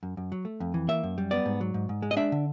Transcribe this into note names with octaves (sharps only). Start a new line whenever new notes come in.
F#2
F#2
F#3
A3
F2
E3
A#3 E5
F#2
G3
B3 D5
G#2
F#3
G#2
G#2
G#3
D#5
D4 E5
D3